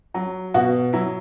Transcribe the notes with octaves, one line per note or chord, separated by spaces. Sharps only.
F#3
B2 F#4
F#3 E4